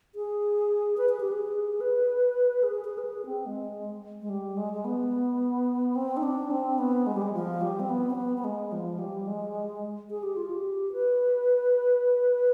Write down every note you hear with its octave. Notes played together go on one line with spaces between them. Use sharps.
G#4
B4
G#4
G4
G#4
B4
G#4
G#4
B4
G#4
C4
G#3
G#3
G3
G#3
G#3
B3
C4
D#4
D4
C4
B3
G#3
G3
G#3
F3
G3
C4
B3
C4
B3
B3
G#3
F3
G3
G#3
G#4
G4
F4
G4
B4